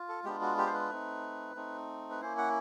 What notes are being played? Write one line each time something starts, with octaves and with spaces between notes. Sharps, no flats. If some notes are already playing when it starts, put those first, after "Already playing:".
Already playing: F4
A4
G#3 B3 D4 F4 G4
F#4
G4
C5
B4
A3 C4 D#4
A3 C4 D#4
B4
A#3 C#4 E4 C5
F#5